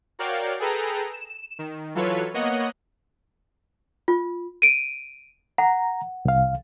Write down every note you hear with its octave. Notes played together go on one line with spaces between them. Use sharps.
F#4 A#4 C#5 D5 F5 G5
G#4 A4 B4 G5 A#5
E7
D#3
E3 F#3 F4 A4 B4 C#5
A#3 B3 C#5 D#5 F#5
F4
D7 D#7
F#5 A#5
C2 F5